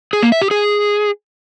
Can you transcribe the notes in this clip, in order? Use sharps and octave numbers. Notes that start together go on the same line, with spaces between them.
G#4
A#3
E5
G4
G#4